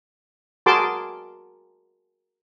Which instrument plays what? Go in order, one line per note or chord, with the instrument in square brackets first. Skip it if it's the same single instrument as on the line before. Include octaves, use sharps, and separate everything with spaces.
[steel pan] F#4 G#4 A#4 A5 C6 D6